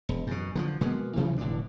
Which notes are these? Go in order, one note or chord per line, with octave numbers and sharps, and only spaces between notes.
E1
F#2 B2
D3 D#3 F3
B2 G#3 A#3 B3
G2 C3 E3 F3
F1 A2 D3 D4